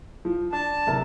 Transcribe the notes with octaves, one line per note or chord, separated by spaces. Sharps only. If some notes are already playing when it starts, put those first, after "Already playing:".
F3
D4 A5
D1 C3 A#4